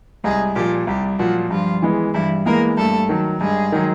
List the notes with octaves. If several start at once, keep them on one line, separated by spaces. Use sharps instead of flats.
C2 G#3 G#4
A#2 F3 G3 G4
C2 G3 G4
A#2 F3 F#3 F#4
G2 F3 F4
E3 G#3 B3
G2 E3 E4
E3 G#3 A#3 B3 A#4
G2 A3 A4
D#3 F#3
G2 G#3 G#4
D#3 F#3